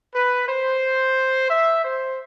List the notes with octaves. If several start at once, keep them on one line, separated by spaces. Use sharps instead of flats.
B4
C5
E5
C5